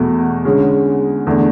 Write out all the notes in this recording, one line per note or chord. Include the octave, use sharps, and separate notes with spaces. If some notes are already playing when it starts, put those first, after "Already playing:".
Already playing: E2 B2 A3
D3 G#3 C#4
E2 D3 A3 D4